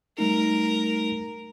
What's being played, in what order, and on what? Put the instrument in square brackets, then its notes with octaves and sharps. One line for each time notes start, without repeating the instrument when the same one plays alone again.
[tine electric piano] G3 A3 D#4 [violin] A#4